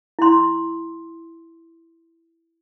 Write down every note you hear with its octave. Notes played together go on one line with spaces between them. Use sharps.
E4 C6